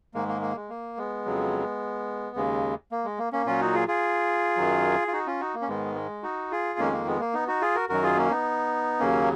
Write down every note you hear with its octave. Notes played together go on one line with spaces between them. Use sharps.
G#2 D#3 G#3 A#3
A#3
A#3
G#3
A#3
G#3 B3
F2 C#3 F#3
D#2 C#3 G#3
A#3
G#3
A#3
A#3 C#4
A#2 F#3 C#4 F4
D#4 F#4
F4 G#4
F4 G#4
F#2 D#3 F#3
F4
D#4 F#4
C#4 F4
D#4 F#4
A#3
C#4
G#2 D#3 G#3 B3
G#3
D#4 F#4
F4 G#4
F2 D#3 G#3 A#3 C#4
A#3
G#3 B3
A#3
B3 D#4
D#4 F#4
F4 G#4
F#4 A#4
F#2 D#3 F#3 F#4 A#4
F4 G#4
A#3 C#4
B3 D#4
D#2 C#3 F#3 A#3 C#4